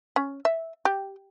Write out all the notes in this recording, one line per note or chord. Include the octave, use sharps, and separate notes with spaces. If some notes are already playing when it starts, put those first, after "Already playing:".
C#4
E5
G4